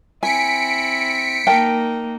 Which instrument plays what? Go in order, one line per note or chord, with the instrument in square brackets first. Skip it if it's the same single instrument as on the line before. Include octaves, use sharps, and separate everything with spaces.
[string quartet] C4 E4 [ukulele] G#5 [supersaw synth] B6 C#7 D7
[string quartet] A#3 D#4 [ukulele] A#4 G5 A5